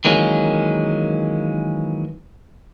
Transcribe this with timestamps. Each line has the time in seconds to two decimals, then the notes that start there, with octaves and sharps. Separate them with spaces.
0.05 D#3 E3 F#3 G#3 A#3 C#4